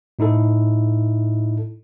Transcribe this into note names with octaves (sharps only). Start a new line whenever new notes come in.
A2 D#4 E4 A4